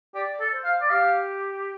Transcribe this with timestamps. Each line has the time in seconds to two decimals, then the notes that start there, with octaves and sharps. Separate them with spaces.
0.14 G4 D5
0.40 A4
0.52 C5
0.64 F5
0.81 D5
0.90 G4 F5